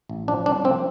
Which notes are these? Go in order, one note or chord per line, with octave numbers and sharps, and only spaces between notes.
A1
F3 D4
C2 D4
F3 C4